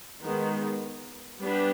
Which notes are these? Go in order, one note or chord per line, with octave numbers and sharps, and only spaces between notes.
D#3 G#3 B3
G3 B3 D4 G4 B4